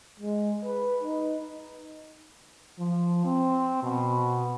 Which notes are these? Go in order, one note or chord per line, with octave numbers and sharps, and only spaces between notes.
G#3
B4
D#4
F3
C4
B2